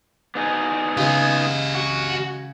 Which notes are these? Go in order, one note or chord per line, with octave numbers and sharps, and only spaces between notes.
B3 D#4 G#4
C#3 G#3 G4 D#5
F#4